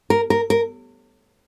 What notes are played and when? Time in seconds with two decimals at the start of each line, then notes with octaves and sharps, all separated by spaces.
0.10 A#4
0.30 A#4
0.50 A#4